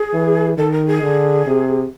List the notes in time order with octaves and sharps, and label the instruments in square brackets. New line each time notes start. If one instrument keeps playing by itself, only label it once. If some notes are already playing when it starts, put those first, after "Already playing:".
Already playing: [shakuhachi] G#4
[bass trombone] E3
[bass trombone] D#3 [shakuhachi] A4
[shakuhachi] A#4
G#4
[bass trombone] D3
C3